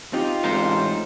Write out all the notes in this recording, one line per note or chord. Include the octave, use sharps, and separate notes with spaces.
C4 D#4 F4 G4
A1 C3 G#3 D#4 A#4 C5